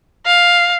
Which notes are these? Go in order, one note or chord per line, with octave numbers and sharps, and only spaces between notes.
F5